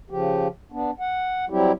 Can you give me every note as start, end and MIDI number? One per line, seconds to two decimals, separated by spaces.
0.10 0.48 49
0.10 0.48 53
0.10 0.48 67
0.72 0.91 59
0.72 0.91 62
1.00 1.45 78
1.50 1.72 54
1.50 1.72 55
1.50 1.72 60
1.50 1.72 64
1.50 1.72 67